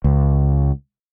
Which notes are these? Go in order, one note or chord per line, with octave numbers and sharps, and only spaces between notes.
C#2